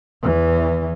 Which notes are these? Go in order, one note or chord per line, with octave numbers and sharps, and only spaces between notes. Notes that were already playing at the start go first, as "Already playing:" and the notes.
E2 E3